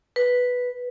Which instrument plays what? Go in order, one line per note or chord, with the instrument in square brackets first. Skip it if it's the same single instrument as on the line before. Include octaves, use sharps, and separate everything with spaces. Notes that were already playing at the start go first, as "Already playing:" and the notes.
[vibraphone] B4